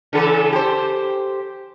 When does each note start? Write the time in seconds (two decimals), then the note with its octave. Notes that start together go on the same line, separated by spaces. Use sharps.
0.13 C#3 E3 A4
0.52 G4 C5